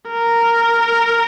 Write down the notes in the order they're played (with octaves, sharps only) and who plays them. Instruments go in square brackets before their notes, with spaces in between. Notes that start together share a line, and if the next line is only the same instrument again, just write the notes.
[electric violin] A#4